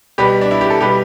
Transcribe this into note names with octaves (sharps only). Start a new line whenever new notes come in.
B2 G3 G4 B4
D4
E4
G4
A4
B2 G3 G4 B4